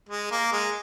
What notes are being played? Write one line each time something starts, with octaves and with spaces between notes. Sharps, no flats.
G#3
A#3
G#3